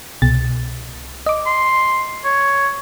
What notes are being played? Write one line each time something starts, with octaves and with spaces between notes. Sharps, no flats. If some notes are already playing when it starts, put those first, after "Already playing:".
C2 B2 A6
D#5 D6
C6
C#5